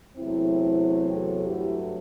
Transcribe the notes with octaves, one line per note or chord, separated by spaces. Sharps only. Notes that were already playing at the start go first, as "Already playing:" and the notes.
E2 C3 F#3 A3 C4 E4
F#4 A4
G2 F#3 A3 E4 G4